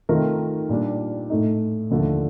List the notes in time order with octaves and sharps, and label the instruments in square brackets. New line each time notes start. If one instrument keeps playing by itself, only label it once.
[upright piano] D#3 A3 C4 F4 A#4
A#2 G3 D4
A2 A3 D#4
D#2 D3 F3 A3